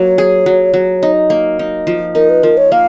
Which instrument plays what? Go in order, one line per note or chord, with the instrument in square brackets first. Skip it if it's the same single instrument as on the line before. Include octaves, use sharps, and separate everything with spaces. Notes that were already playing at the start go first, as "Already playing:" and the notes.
Already playing: [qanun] F#3 A#3 [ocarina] C#5
[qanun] G#4
F#3
F#3
D#4
A#3
D#4
F3
[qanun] D#4 [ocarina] A#4
[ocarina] B4
[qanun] F3 [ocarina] A#4
[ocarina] C#5
[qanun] A#3 [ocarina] F5